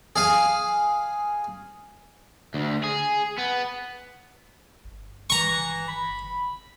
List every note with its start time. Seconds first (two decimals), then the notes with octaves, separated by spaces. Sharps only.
0.16 G#4 F5 G#5
2.54 D2
2.83 G#4
3.38 B3
4.85 G1
5.30 E3 A#5 C#6
5.89 B5